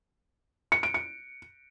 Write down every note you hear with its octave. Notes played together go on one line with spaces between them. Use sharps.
C#7
D7
C#7